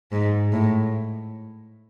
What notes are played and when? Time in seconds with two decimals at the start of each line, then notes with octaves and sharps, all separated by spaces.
0.11 G#2
0.52 A2